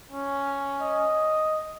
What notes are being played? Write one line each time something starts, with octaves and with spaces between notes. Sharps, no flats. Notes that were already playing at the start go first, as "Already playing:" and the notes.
C#4
D#5